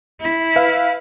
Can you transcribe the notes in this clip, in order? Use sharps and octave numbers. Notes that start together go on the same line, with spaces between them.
E4
B4 E5 F5